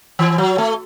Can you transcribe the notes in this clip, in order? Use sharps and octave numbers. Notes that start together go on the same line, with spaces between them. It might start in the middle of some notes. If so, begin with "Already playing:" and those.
E3
F#3
A3